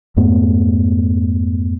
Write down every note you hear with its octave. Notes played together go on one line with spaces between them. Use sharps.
F2 G#2 A3 B3